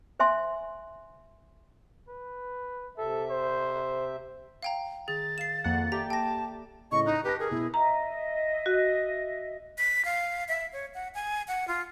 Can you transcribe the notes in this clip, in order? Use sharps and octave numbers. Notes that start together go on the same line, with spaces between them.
C5 E5 G#5 C6
B4
C3 A4 E5
C5
F5 G5 A#5
D#3 G#4 A6
F5 C7 E7
F2 A#3 F#5
G4 A4 D5 E5 A#5
G5 A5 E6 A#6
A2 C#3 D#5 C#6
D#4 F#6
G4 B4 G5 A5 A#6
G#4 A#4
B2 E4
D#5 E5 A#5
F#4
B6
F5
E5
C#5
F#5
G#5
F#5
F4